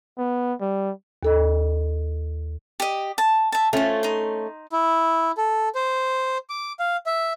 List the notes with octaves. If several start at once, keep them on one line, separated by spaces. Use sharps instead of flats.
B3
G3
D#2 A4 D#5
G4 D#5
A5
E5 A5
A3 C#4 F4 C5
D#4 C6
E4
A4
C5
D6
F5
E5